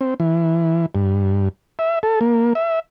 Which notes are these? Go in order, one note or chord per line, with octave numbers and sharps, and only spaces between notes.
C4
E3
G2
E5
A4
A#3
E5